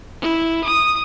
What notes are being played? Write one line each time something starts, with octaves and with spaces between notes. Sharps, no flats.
E4
D#6